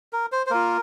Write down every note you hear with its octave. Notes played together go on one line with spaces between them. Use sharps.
A#4
C5
C5
A#3 F4 A#4